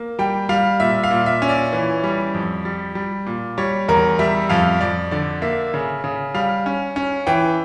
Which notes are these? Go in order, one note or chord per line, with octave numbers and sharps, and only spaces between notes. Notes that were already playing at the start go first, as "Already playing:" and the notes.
Already playing: A#3
G3 G5
G3 F5
A#2 E5
F5
A#2
E5
C#4
D5
E3
G3
F2
G3
G3
A#2
G3 C#5
E2 A#4
G3 E5
F2 F5
F2 D5
D3 D5
A#3 E5
C#3
C#3
G3 F5
C#4
C#4
E3 G5